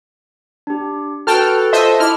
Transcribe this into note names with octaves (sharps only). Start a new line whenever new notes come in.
D4 G4
F#4 A4 B4 G5 A5 F6
F4 C5 D#5 E5 A5
E4 D#5 A5 D6 F6